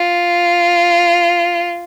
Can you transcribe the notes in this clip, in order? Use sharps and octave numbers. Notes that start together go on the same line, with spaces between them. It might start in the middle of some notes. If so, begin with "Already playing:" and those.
Already playing: F4